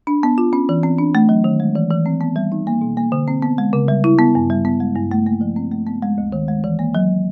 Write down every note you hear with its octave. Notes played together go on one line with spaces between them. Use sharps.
D4
B3
F4
C#4
E3
C4
D4
A3
F#3
D#3
G#3
E3
E3
C4
B3
G3
D#4
A#3
B2
A#3
D3
C4
B3
G#3
C#3
G3
E4
B3
G2
G3
B3
G#3
G2
A3
A#3
F3
C4
A3
B3
G#3
D2
D#3
G#3
E3
A#3
F#3